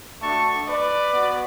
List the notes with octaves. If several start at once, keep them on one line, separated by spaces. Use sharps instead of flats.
A3 D4 F#4 A5 C#6
B4 D5
B3 F#4